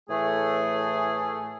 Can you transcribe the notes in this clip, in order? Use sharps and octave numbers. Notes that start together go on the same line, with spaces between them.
A2 E3 A3 G#4